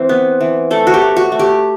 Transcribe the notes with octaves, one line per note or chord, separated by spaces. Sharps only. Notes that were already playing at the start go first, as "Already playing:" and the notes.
Already playing: E3 C4
B3
E3
A3 A4
F#4
G4
A3
F#4
A3
G4